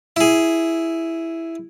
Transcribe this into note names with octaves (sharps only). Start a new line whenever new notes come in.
E4 G#4